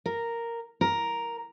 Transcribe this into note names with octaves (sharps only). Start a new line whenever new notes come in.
A#4
A#4